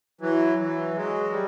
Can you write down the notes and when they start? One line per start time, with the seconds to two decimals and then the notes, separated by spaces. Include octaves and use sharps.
0.21 E3 F#3
0.58 E3 F#3
0.96 F#3 G#3
1.32 G3